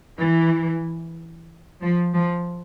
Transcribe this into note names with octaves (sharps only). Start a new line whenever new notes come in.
E3
F3
F3